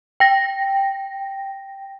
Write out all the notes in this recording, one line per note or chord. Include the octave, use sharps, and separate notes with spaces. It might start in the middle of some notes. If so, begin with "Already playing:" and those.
G5 A#6